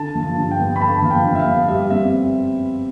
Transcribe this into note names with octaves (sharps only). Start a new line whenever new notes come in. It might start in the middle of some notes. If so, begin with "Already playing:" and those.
Already playing: D3 A5
F3
A5
G2
G5
B3
B5
D3 A5
F3 F5
G5
G2
E5
F5
B3
G3 E5
C4 E5